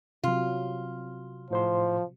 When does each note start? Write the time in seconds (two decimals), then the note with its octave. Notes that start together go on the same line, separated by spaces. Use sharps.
0.24 C3 F#3 F4
1.51 A2 F3 C5 C6